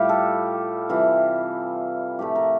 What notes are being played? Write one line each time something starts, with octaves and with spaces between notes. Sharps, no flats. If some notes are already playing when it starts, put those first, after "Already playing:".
Already playing: A2 G3 F4 G4
A4
C3 E3 G3 F4
A2 F3 A3 G4
A#4